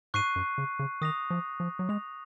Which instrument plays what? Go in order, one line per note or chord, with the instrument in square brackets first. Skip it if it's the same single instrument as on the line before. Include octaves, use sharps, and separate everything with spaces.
[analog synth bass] G#2 [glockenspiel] C#6 F#6 C7 D#7
[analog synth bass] F#2
C#3
C#3
[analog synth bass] D#3 [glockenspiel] D#6 A#6 F7
[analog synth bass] F3
F3
F#3
[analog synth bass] G#3 [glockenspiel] D#6 A#6 F7